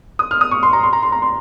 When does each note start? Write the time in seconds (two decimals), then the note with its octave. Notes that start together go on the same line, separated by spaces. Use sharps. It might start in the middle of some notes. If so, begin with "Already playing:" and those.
0.19 D#6
0.31 F6
0.41 D#6
0.51 C#6
0.63 C6
0.73 A#5
0.83 C6
0.93 A#5
1.03 C6
1.12 A#5
1.22 C6